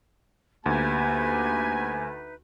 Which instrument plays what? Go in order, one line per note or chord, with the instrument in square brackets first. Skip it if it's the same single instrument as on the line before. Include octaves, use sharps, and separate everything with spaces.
[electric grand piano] D2 [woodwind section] A#3 G4 [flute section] D#4 B4 E5 [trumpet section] G#5